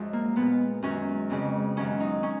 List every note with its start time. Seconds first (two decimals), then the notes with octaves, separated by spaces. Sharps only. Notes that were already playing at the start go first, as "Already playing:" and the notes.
Already playing: F#2 F3 G#3
0.13 A#3
0.36 A#2 G#3 B3
0.82 F#2 D#3 G#3 C#4
1.30 F2 C#3 G#3
1.77 F#2 D#3 F#3 C#4
2.00 D#4
2.23 C#4